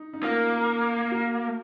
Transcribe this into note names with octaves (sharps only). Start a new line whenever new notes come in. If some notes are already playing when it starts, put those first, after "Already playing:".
Already playing: D#4
D#4
A#3 F4
F#4